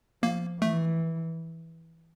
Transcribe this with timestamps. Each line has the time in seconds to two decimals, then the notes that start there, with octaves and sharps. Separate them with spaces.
0.22 F3 A#3
0.62 E3 A3